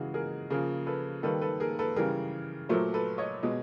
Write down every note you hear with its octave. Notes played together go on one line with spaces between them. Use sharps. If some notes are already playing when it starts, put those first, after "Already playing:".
Already playing: C#3 E3 G#3 F#4 G#4
G#4 A#4
C#3 F3 A#3 G#4 A#4
A4 B4
D#3 G3 A#3 A4 B4
A4 B4
G#4 A#4
A4 B4
C#3 E3 G3 G#4 A#4
A#2 F#3 A3 A#4 C5
A4 B4
C#5 D#5
B2 G#3